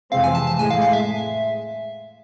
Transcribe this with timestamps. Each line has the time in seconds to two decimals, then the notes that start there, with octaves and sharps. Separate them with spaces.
0.12 F2 C3 E3 G#3 C4 F5
0.24 G#5
0.35 A5
0.47 A5
0.59 A2 E3 G#3 G#5
0.71 F5
0.82 F5
0.93 E5